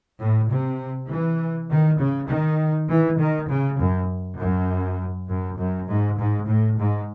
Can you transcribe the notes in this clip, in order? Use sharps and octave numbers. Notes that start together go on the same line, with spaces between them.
A2
C3
E3
D#3
C#3
D#3
E3
D#3
C#3
F#2
F#2
F#2
F#2
G#2
G#2
A2
G#2